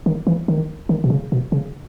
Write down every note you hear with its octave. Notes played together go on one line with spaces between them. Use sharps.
D#3
E3
D#3
D#3
B2
C#3
B2
C#3